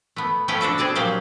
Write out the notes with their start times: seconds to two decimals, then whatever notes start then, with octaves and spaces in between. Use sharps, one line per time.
0.16 A3 B3
0.48 A3 B3 C#4 B4 F5 G5
0.61 D4 F#4 A4 E5
0.78 C4 G#4 D5 A5
0.95 A#2 F3 F#3 G4 F5